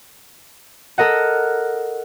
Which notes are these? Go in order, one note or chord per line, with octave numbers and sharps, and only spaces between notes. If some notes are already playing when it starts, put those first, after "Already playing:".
A4 A#4 D#5 F#5